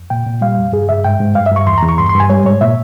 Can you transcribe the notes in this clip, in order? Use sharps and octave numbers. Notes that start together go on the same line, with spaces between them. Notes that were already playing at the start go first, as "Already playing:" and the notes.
Already playing: F2
A#2 G5
A#2
G3 F5
F2
G2 G#4
G2 E5
G#2 G5
G#2
G2 F5
E5
G2 C#6
E2 C6
A#5
E2
C#6
G2 C6
C6
G2
G#5
G3 C#5
G#2 C#5
A#2 E5